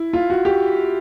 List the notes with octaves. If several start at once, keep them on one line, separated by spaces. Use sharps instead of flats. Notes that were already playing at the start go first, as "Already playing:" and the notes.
Already playing: E4
F4
F#4
G4